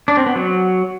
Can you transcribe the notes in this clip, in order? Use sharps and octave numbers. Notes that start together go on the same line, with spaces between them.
D4
C4
B3
F#3